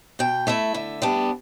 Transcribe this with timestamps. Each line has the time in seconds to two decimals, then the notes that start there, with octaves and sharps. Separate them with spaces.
0.19 B2 G5
0.47 A3 E4 E5
0.74 D3
1.02 G3 B3 D4